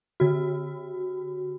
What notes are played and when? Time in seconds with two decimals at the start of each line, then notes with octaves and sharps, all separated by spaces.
0.20 D3 F#4